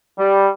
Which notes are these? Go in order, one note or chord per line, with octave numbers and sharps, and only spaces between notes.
G3